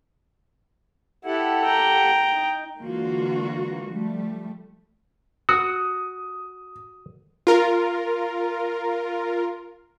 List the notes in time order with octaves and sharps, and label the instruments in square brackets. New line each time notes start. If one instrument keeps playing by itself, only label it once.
[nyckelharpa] E4 [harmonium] G4 A4 F#5
[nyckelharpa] G5 A#5
[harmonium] D#4
[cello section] D3 E3 G#3 A#3 F4 F#4
F3 G3 A3
[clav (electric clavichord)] F#4 [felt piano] D#6
[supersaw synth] F4 A#4